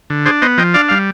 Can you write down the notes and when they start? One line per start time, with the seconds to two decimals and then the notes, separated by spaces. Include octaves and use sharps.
0.10 D3
0.26 D4 G#4 C5
0.42 B3 C5 D#5
0.58 F3 D#5 G5
0.74 D4 D5 F5
0.89 G3 F5